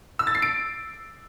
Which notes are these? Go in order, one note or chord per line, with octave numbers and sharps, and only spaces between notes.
E6
A6
C7
D7